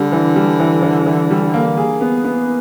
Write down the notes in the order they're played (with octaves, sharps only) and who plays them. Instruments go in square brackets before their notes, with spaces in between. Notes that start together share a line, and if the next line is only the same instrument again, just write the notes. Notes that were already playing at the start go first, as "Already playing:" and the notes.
Already playing: [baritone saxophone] D3 [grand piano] G3
[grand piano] E3
G3
E3
E3
E3
G3
A#3
G#4
B3
B3